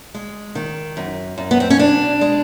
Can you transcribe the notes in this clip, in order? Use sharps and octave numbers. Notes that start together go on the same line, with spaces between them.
G#3
D#3
F#2
F#2
B3
C4
C#4
B2 D4
G#3